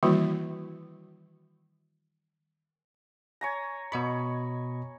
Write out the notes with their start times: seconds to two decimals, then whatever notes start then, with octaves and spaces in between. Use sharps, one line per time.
0.03 D#3 E3 G3 A#3 E4 F#4
3.41 C#5 G#5 A#5
3.92 B2 C#5 D#5 B5